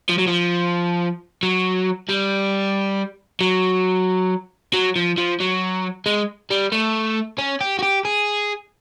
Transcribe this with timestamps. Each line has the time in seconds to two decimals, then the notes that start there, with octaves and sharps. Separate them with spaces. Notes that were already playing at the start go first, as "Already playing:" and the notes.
0.10 F3
0.19 F#3
0.28 F3
1.43 F#3
2.09 G3
3.41 F#3
4.73 F#3
4.96 F3
5.18 F3
5.40 F#3
6.06 G#3
6.51 G3
6.72 A3
7.39 C#4
7.61 G4
7.79 F#4
7.83 G4
8.05 G#4